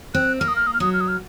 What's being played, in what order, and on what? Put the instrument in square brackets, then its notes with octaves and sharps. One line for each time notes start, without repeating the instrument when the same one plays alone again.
[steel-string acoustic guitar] C4 [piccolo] F#6
[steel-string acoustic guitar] A#3 [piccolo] F6
[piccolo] D#6
F6
D#6
F6
[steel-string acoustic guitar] F#3 [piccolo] D#6
[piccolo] F6
D#6
F6